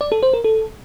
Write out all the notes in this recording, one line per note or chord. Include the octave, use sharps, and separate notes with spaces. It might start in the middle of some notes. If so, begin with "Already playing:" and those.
D5
A4
C5
A#4
A4